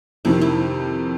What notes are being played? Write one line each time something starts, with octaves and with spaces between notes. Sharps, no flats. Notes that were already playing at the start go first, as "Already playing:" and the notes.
F2 C3 D#3 E4
E4